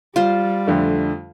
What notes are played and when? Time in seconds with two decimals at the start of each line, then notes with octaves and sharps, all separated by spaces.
0.16 G3 F4 C5
0.67 F2 D3 A3